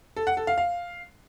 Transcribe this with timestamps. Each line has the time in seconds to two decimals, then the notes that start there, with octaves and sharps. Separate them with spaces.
0.16 A4
0.27 F#5
0.37 A4
0.47 F5
0.58 F5